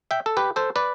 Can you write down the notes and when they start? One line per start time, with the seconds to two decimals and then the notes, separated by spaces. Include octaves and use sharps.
0.11 E5 G5
0.26 A4
0.37 G4 B4
0.56 A4 C5
0.76 B4 D5